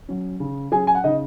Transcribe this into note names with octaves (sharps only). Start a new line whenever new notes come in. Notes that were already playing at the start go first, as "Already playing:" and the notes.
F#3 C#4
C#3
F#3 C#4 G#4 G#5
G#5
F#5
C#3 D#4 D#5